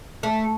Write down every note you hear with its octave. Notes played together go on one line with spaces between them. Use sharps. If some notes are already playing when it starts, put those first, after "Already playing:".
A3